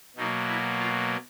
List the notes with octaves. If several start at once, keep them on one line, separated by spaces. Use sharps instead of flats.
B2 F#3 A#3 D#4
E4
F4